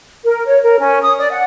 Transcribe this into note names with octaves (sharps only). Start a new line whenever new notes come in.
A#4
C#5
A#4
C#4
D#6
D5
F#5